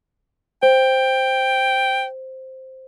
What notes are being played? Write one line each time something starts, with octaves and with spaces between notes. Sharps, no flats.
C5 G5